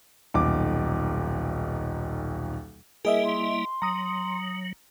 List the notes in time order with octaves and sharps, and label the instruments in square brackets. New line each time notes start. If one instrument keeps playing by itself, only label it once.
[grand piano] D#1 B1 D6
[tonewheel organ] G3 A#3 E4 [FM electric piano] G#4 D#5 E5 [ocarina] A#4
[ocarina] C6
[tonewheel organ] F#3 [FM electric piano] A#5 D#6